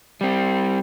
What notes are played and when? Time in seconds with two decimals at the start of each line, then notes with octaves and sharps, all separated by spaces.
0.21 G3 C4